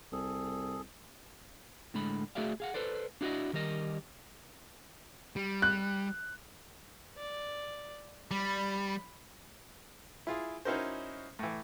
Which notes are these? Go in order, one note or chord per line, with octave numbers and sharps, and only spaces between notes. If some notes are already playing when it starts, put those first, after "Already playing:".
C2 G#4 A4
A2 D3 G#3 B5
A3 F#4 G#4 D5 E5 F5
G#4 F5 F#5
A4 B4 C5 D5
D4 E4 F#4 C5 D5 D#5
D#3 G3 A#4 D#5
G3
F#6
D5
G3 B5
E4 F4 G#4
C#4 D#4 E4 F#4 A#4 C5
A2 E3